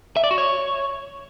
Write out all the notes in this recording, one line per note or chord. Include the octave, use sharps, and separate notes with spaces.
E5
D5
F#4
C#5